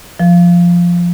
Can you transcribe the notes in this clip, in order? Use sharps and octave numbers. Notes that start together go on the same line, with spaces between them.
F3